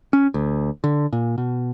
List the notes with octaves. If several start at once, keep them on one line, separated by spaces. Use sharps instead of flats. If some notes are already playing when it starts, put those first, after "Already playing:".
C#4
D2
D3
A#2
B2